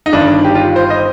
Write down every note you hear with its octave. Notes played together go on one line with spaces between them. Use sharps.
D#4
G1 G2 D#3 D4
G4
F4
C5
D#5